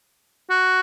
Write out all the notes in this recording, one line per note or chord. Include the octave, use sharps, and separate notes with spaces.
F#4